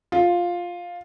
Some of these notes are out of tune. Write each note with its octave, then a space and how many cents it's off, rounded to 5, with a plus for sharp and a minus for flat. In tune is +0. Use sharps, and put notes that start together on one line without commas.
F4 +5